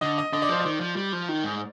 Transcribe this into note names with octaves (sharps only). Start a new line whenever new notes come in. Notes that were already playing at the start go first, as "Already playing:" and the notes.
D3 D#5
D#5
D3 D#5
D5
F3 C5
D5
D#3
F3
G3
F3
D#3
G#2